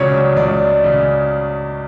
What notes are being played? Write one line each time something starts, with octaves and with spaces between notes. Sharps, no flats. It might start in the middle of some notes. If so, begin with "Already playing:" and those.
Already playing: C#2 C#3 F#3 C#5 D5
C#2 D5
C#3